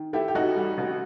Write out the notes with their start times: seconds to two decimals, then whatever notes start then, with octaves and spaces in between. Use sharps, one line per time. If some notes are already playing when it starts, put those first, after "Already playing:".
Already playing: D#3
0.13 A3 E4 G4
0.28 G4
0.35 A1 D#4 F#4
0.56 G3
0.78 A1